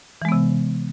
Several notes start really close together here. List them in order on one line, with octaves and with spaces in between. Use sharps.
E3 G#3 B3 C3